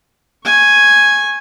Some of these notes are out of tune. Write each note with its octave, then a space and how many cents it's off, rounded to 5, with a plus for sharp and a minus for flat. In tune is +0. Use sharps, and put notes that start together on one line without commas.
G#5 +0 C#6 -20